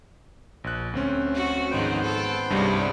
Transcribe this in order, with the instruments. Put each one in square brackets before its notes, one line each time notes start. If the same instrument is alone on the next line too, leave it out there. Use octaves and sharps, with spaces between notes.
[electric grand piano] A#1 F#6
D2 C4 C#4
[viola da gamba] F#4
[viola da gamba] G#2 D#3 F3 [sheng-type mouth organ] B3 C5 G5
[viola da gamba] A4
[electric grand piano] C2 G2 [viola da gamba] G3 G#3 C#4